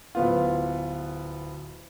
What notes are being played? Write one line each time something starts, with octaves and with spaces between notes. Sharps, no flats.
D1 B3 F4